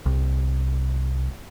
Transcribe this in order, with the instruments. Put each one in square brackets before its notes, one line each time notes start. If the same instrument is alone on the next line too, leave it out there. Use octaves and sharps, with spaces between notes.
[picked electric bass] C2